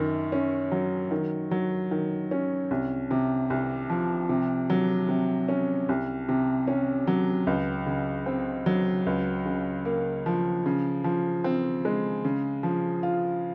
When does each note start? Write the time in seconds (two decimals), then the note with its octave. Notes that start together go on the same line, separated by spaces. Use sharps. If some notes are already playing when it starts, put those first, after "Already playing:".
Already playing: F#2 D#3
0.32 C#4
0.72 F#3
1.11 D#3
1.51 F#3
1.91 D#3
2.31 C#4
2.71 C2
3.11 C3
3.50 C2
3.90 F3
4.29 C3
4.70 F#3
5.08 C3
5.48 C#4
5.89 C2
6.29 C3
6.67 C#4
7.07 F#3
7.47 C#2
7.86 C#3
8.26 C4
8.66 F#3
9.06 C#2
9.46 C#3
9.85 A#3
10.26 F3
10.66 C#3
11.04 F3
11.44 C4
11.85 G#3
12.25 C#3
12.63 F3
13.03 F4